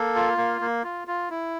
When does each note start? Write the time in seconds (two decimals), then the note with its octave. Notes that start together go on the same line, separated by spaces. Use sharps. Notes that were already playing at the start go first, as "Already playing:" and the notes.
Already playing: A#3 A4
0.15 F4
0.38 A#3
0.61 A#3
0.84 F4
1.08 F4
1.30 E4